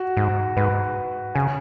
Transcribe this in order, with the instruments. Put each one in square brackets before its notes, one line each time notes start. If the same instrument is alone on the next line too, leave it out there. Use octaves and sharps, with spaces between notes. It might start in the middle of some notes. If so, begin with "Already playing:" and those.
Already playing: [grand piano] F#4
[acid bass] G#2
[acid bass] G#2 [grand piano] B4
[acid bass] C#3 [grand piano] G#5